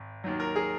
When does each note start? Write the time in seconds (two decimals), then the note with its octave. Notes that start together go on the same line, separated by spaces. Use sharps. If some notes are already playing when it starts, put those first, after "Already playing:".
Already playing: G#1
0.24 D#2 D#3 F#3
0.40 A#4
0.56 G#4